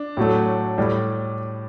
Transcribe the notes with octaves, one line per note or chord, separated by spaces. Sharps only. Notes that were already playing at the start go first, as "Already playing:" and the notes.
Already playing: D4
A2 F#3 A3
A2 G3